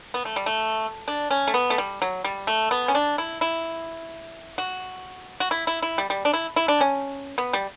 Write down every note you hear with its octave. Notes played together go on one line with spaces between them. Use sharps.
B3
A3
G3
A3
D4
C#4
A3
B3
A3
G3
F#3
G3
A3
B3
C#4
D4
E4
E4
F#4
F#4
E4
E4
E4
G3
G3
D4
E4
E4
D4
C#4
B3
G3